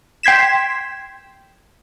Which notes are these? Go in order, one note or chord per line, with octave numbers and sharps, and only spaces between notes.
G5 C6 G#6 B6 E7